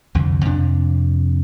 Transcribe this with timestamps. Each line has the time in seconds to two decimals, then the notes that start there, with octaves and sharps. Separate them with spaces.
0.15 C2 F2 D3
0.45 F2 C3 D4